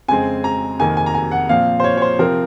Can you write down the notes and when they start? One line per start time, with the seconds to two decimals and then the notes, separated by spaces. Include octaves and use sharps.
0.08 F2 C#3 G#3 C4 G#5
0.44 A#5
0.79 F2 C3 D#3 A#3 G#5
0.97 G#5
1.06 A#5
1.15 G#5
1.31 F#5
1.49 A#2 F3 C4 F5
1.80 C5
1.84 C#5
1.97 C#5
2.02 C5
2.19 C3 F3 C4 A#4